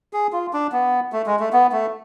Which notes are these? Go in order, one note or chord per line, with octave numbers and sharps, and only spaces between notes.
G#4
F4
D4
B3
A3
G#3
A3
B3
A3